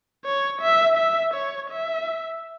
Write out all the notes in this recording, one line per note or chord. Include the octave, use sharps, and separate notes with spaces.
C#5
E5
E5
C#5
E5